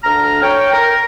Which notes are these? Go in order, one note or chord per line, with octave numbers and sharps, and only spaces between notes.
D2 D4 A#5 F6
C#5 G5
A#4